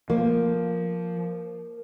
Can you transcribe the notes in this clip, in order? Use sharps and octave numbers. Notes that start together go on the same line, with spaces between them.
F3 A#3